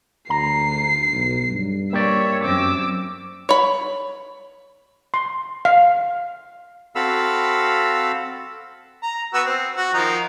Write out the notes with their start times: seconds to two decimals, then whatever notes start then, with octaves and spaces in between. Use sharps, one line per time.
0.30 D2 A#5 C7
1.13 B1
1.51 G2
1.93 A#3 G4 C#5 D5 E5
2.44 F#2 C4 D6 E6
3.49 C#5 B5
5.14 C6
5.65 F5
6.95 C4 F#4 A4 F5 B5 E6
9.02 A#5
9.34 B3 F#4 E6
9.45 C4
9.77 F#4
9.94 D#3 F3 D#4